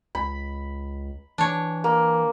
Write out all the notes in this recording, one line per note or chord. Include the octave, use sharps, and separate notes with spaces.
C#2 B5
E3 D4 C#5
A#3